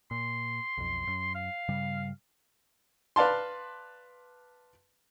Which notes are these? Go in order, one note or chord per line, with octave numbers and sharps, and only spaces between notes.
A#2 C6
B1 F2
F#2
F5
G2 C#3 G3
B4 D5 F5 A5 C6